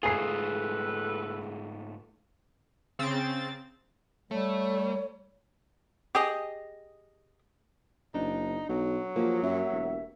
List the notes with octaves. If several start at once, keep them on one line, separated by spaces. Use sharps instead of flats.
G#2 A3 F4 G#4 A4 B4 G#5 C7
C#3 C4 A6
G3 A3 C#5
G4 G#4 D#5
F#1 D4 D#4
B1 F#3
F3 A#3 G4
F#2 E5
E1